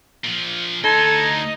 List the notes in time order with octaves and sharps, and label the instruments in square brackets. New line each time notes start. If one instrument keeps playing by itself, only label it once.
[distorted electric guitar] A#2 F3
[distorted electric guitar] D2 C6 [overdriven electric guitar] D#4 [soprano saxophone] A4 [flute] G#6